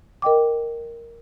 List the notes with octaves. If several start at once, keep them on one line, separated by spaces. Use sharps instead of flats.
A#4 D#5 G5 D6